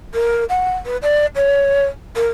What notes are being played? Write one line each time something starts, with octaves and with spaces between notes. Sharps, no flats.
A#4
F#5
B4
D5
C#5
A#4